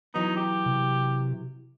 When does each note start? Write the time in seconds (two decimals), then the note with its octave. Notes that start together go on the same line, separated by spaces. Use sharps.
0.14 E3 F#3 B3 D#4
0.36 G4
0.66 C3